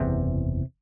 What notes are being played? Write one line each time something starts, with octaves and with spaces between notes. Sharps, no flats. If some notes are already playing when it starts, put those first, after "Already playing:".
Already playing: F#1 E2 C3